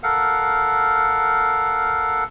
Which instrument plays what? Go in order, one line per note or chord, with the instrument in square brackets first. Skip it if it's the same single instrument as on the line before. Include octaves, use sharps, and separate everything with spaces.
[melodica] A4 A#4 F5 F#5